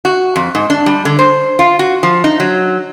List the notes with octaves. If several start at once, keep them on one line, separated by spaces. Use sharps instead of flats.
F#4
F2
G#2
D4
G3
D3
C5
F4
F#4
F3
D#4
F#3